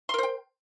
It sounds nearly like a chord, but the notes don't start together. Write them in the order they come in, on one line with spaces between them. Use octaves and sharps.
C6 A#4 C5 G5